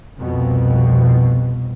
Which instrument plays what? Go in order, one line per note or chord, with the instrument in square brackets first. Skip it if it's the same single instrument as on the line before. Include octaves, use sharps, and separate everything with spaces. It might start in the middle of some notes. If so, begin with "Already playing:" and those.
[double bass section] C2 F2 B2